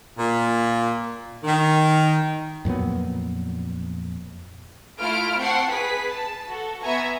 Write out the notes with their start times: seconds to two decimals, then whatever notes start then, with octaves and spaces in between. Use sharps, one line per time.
0.17 A#2
1.44 D#3
2.65 F2 A#2 F#3 B3
5.00 A3 E4 F4 F6 D7
5.40 C4 F#5 G5 A5 C#6 C7
5.70 G#4 B4 B6
6.08 A5
6.50 F#4 A4
6.82 B3 E5 G#5 A#5 C#6